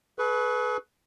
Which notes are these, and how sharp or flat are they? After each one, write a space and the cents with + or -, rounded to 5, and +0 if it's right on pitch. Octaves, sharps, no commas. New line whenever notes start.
G#4 +45 B4 +0 C#6 +0